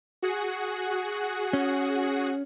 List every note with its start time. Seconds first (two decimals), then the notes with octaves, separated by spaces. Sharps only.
0.23 F#4 G#4 F#5
1.53 C#4